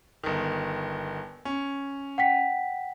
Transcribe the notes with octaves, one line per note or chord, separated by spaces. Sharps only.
G1 D#3
C#4
F#5 G5 B6